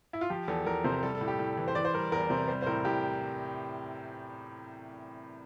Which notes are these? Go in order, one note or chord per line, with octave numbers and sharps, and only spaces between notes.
E4
F4
F3 G4
E2 A4
E2 A#4
C3 C5
G3 A4
A4
A2
G4
A2
E3
C5
E3 D5
C5
G3 A#4
E2 A#4
C3 C5
G3 C5
C5
A2 A#4
A2 G4